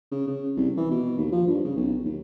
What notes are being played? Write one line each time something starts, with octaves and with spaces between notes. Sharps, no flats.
C#3
C#3
C2
E3
B2
D#2
F3
G2
C#3
B1
D#2